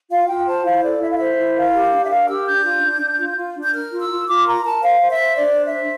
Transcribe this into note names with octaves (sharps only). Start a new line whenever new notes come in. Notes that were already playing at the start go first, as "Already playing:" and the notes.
F4 F5
F4 G5
C5 A5
E4 F5
A4 D5
E4 E5
F5
C5 E5
E4
A#4 F5
G4
D4
E5
A#4 F5
G4 E6
D4 G6
F4
D4
D4
F4
F4
D4
G6
A#4 F6
F4
E6
F4
F4 D6
A#4 A#5
A#4 A5
C5 F5
C5
E5
C5
D4 D5
C5
E5
C5